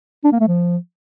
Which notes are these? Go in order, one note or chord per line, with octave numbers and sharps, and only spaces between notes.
D4
A#3
A3
F3